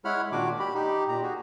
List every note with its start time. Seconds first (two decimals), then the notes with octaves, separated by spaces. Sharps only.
0.05 G#3 E4 C#5 F#5 B5 F6
0.32 A#2 D#3 D4 F#4 D6
0.60 G4 B5
0.74 D#4 G4
1.08 A#2 A#5
1.23 F#4 G#4